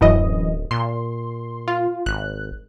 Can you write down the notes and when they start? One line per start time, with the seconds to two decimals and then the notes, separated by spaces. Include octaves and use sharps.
0.01 D1 F#2 E3 D#5
0.71 A#2 C6
1.68 F4
2.06 G#1 F#6